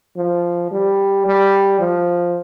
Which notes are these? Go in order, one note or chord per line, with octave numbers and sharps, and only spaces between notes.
F3
G3
G3
F3